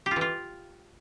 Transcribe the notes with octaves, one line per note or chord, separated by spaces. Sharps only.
G4
F4
E3
F4